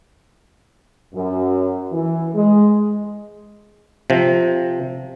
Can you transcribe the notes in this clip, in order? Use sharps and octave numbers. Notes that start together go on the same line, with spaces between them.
F#2
E3
G#3
C3 F3